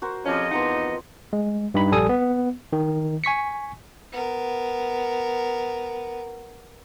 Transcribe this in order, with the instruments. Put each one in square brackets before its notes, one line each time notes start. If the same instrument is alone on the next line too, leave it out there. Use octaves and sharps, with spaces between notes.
[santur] F#4 A#4 C5
[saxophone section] F2 C#4 [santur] F3 G4 [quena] D#5
[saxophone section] E2 D#4 [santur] C4 A#5 C6 [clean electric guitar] B4 F#5
[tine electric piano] G#3
G2 D#4 B5
A#1 G3 A4 G#5 D#6
B3
D#3
G#5 C#6 B6 C#7
[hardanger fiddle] B3 A#4